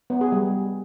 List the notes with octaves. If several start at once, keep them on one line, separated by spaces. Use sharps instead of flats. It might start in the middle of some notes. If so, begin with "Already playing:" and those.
B3
G#4
G3